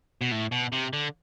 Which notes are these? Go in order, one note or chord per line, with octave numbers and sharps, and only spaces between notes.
B2
A2
B2
C3
D3